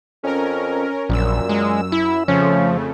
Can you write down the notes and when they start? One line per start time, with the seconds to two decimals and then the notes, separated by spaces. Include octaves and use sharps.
0.23 F2 C#4 A#4
1.10 A#1 F#2 A#2 E6
1.49 G#3
1.92 E4
2.28 F2 C#3 F3 A3 C#4